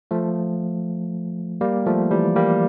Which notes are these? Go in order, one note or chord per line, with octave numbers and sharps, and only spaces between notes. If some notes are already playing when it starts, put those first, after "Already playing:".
F3 A3
G3 A#3
F3 A3
E3 G3
G3 A#3